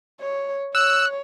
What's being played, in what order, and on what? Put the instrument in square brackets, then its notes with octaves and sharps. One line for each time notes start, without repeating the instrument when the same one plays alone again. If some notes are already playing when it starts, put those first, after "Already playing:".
[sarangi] C#5
[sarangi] C#5 [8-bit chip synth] E6 [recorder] F#6